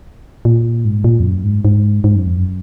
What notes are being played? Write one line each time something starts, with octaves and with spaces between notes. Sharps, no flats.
A#2
G#2
A#2
F2
F#2
G#2
G#2
G#2
F#2
F2
F#2